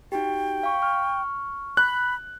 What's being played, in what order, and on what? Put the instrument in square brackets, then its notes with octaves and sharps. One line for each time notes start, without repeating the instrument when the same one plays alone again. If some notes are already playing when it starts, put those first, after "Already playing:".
[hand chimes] D#4 F#4 G4 [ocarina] G5
[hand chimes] F5 C#6
C#6 F6
[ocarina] B5 [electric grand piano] F#6